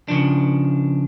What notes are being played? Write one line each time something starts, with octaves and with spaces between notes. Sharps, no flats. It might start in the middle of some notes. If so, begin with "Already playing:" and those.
C#3 F3 D4